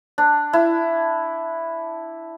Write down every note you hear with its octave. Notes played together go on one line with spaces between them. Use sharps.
D4
E4